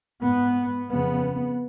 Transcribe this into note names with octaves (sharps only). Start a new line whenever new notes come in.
G#2 B3
F2 C#3 B3